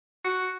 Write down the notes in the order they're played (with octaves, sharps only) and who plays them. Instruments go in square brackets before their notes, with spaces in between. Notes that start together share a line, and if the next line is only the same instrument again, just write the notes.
[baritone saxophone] F#4